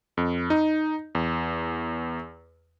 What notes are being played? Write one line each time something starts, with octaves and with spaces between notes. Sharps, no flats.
F2
D#4
E2